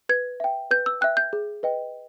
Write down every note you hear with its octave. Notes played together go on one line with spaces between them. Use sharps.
B4 G#6
E5 G5
B4 G6
E6
E5 G5 F#6
G6
G#4
B4 D#5 G5